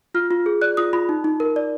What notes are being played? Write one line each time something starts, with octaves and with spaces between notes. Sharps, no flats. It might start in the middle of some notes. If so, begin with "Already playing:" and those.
F4 F6
F4
G#4
D5 F#6
F4 D#6
F4 B5
D#4
D#4
A#4
D5